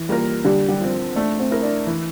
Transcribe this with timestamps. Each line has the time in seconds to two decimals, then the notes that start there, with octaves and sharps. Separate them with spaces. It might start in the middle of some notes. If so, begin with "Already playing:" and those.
Already playing: E3
0.09 G3 A#3 F4 A#4
0.44 D3 G3 G4
0.68 G3 G4
0.80 F3 C4
1.16 A3 D4
1.39 C4
1.51 E4 A#4
1.63 D4
1.87 E3